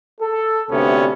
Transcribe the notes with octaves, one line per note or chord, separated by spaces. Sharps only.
A4
D2 G2 C3 A3 B3 C#4